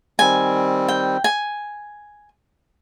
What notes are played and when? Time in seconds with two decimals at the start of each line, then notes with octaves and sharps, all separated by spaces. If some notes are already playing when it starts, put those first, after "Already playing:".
0.19 D#3 G3 C4 G#5
0.89 G5
1.24 G#5